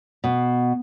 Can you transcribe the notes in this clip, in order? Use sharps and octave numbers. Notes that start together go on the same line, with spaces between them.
B2